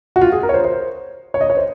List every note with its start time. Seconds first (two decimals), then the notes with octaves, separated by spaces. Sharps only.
0.16 F#4
0.21 F4
0.32 G#4
0.43 A#4
0.49 C#5
0.54 C5
0.64 C5
1.34 C#5
1.41 D#5
1.50 C#5
1.57 C5